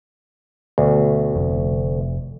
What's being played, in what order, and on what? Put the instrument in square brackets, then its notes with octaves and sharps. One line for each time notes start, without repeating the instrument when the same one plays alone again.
[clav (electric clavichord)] D2 [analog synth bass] B2
[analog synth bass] F1